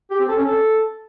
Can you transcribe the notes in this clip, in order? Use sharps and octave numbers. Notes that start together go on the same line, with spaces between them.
G4
C4
A4
C#4
A4